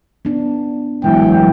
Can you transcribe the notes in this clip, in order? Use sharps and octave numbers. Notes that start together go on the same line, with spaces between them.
B3 D4
A1 E3 F#3 G#3 B3 G5